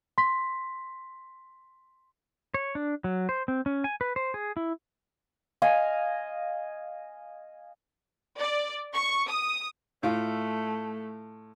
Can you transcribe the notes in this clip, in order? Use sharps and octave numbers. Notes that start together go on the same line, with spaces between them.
C6 B6
C#5
D4
F#3
C5
C4
C#4
G#5
B4
C5
G#4
E4
D#5 F5 G#5
D5
C#6
D#6
A2 A3 F4